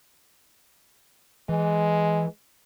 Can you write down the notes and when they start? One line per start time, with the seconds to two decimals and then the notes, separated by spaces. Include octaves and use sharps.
1.49 E3 G#3